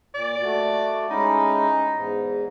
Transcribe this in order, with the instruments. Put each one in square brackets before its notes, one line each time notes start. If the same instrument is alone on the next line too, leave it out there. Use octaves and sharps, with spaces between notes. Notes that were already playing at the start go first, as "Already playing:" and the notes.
[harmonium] A#2 [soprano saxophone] D5
[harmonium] A3 F#4
[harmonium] G#3 C#4 E4 [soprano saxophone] D#4
[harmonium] E2 G#2